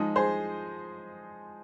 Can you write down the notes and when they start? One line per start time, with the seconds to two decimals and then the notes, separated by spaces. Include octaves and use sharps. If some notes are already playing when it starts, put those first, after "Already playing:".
Already playing: F3 G#3 D#4
0.16 G#4 C5